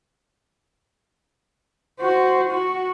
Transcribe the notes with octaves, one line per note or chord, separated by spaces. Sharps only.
F#4 C5
F#4